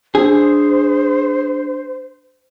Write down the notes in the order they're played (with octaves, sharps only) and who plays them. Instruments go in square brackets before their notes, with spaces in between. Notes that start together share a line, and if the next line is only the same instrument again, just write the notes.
[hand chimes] D4 [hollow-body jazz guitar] G#4 [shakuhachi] C5